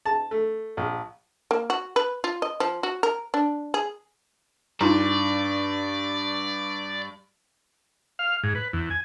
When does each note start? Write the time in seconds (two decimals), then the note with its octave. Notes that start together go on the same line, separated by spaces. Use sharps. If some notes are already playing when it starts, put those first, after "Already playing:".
0.06 A5
0.31 A3
0.77 A#1
1.51 A#3
1.70 F#4
1.96 B4
2.24 F4
2.42 D#5
2.60 F3
2.83 F#4
3.03 A#4
3.34 D4
3.74 G#4
4.81 G2 D4 D#4 F4 D5 A#5
8.19 F5
8.43 G#2
8.55 B4
8.73 E2
8.90 G#5